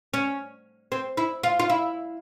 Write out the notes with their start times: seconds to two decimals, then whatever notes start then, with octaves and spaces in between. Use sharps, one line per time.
0.14 C#4
0.92 C4
1.17 E4
1.43 F4
1.59 F4
1.69 E4